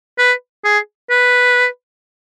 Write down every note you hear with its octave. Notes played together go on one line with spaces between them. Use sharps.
B4
G#4
B4